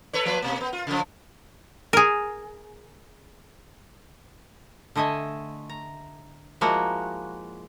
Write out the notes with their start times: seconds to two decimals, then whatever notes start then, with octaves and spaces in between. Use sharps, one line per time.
0.13 A4 B4 C#5
0.25 F3 A#3 B4
0.42 B2 A#3
0.60 B3
0.73 F4
0.87 C#3 F3
1.93 G#4 A#4
4.96 D3 A3 D#5 E5 G#5
5.69 A#5
6.61 F3 G#3 A#3 E4 F#4